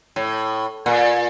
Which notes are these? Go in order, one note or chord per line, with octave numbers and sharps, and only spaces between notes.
A2
A#2